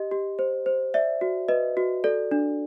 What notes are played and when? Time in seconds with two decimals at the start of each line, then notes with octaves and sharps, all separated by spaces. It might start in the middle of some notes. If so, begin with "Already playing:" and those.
Already playing: G4 D#5
0.11 G4
0.39 C5
0.66 C5
0.94 D5 E5
1.21 F#4
1.48 B4 D#5
1.77 F#4
2.04 A4 D5
2.31 D4